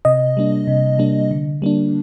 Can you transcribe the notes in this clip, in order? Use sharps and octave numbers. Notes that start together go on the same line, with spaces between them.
C3 D#5
G3 A#3 D4
C3
G3 A#3 D4
D3
G3 A#3 D4